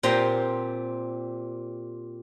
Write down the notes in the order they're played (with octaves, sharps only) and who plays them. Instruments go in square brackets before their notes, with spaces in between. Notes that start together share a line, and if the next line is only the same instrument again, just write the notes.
[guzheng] A#2 C4 G4 C5 A#5 C6